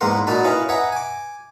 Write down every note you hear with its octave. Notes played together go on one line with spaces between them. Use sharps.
E2 G#2 A#3 B3 A#4 C6
A#2 D#4 F#4 A5 B5
C#4 E4 B4 D#5 F5
B4 D#5 E5 F#5 G#5 A#5
G#5 D6